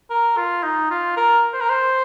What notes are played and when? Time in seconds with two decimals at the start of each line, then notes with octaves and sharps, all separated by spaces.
0.10 A#4
0.37 F4
0.63 D#4
0.91 F4
1.17 A#4
1.53 C5
1.61 A#4
1.70 C5